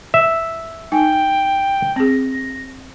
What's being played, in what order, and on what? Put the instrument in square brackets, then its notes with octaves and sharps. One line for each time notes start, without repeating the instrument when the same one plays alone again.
[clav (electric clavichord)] E5
[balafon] D#4 G#5 [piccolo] G5
[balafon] C4 G#4 [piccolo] A#6